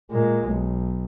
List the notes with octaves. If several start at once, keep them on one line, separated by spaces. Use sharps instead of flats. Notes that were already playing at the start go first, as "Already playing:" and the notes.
A#2 G#3
B1